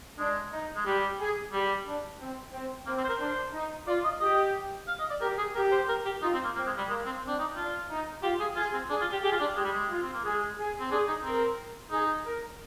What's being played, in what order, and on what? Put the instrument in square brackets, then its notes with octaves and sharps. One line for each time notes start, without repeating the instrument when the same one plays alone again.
[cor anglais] G#3 [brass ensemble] D4
[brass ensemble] D#4
[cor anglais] G#3
[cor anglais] G3 [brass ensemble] G4
[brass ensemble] G#4
[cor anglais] G3 [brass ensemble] G4
[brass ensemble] D4
C4
C4
[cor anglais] A#3 [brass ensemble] C4
[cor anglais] C4
C5
A#4
[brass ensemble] D4 [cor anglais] C5
[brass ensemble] D#4
[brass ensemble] F4 [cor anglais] D5
[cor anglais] D#5
[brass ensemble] G4 [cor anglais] D#5
[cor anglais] F5
D#5
D5
[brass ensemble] G4 [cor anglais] A#4
[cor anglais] G#4
[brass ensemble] G4 [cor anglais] A#4
[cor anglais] C5
A#4
G4
[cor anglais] D#4 [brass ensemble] F4
[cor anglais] C4
A#3
[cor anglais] A#3 [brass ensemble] C4
[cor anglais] G#3
G3
[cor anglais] G#3 [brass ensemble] A#3
[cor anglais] C4
[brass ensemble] C4 [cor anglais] D4
[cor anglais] D#4
[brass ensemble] D4 [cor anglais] F4
[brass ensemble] D#4
[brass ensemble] F4 [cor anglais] G4
[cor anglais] G#4
[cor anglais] F4 [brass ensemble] G#4
[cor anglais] C4
[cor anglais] D4 [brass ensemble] G#4
[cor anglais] F4
G4
[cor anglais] G4 [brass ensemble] G#4
[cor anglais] F4
D4
[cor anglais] G#3 [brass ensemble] G4
[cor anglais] G3
G#3
[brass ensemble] F4
[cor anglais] C4
A#3
[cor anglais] G#3 [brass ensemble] G#4
[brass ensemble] G#4
[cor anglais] C4
[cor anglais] D4 [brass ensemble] G#4
[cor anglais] D#4
[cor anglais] C4 [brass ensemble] A#4
[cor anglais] D#4 [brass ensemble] G#4
[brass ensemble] A#4